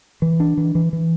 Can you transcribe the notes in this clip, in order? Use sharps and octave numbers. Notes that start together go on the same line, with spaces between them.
E3
D4
E3
E3
E3